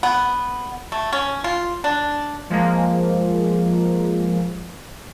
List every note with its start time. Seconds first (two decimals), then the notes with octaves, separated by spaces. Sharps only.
0.03 B3
0.92 A3
1.13 C#4
1.44 F4
1.84 D4
2.50 F3 G#3 A#3